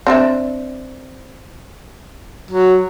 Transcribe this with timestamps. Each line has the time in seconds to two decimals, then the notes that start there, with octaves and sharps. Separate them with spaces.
0.07 C4 D4 E5
2.51 F#3